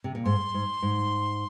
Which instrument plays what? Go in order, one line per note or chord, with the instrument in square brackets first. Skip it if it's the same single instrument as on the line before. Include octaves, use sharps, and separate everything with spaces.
[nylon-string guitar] C3
A#2
[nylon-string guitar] G#2 [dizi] C6
[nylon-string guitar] G#2
G#2